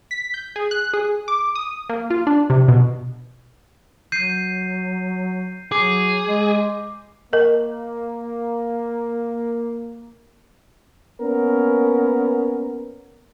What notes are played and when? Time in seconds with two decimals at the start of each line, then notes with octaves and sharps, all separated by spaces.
0.11 B6
0.34 G6
0.56 G#4
0.71 F#6
0.94 G#4
1.28 D6
1.55 D#6
1.90 A#3
2.10 F4
2.27 D4
2.50 C3
2.68 B2
4.12 F#3 G6 C7 D#7
5.72 F#3 G#4 D6
6.28 G#3
7.33 A#3 A#4 D#5
11.21 A#3 B3 C#4 A#4